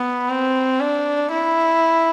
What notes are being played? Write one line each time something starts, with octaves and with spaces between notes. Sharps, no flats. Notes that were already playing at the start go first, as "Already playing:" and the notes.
Already playing: B3
C4
D4
E4